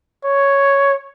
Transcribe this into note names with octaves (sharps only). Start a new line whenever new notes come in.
C#5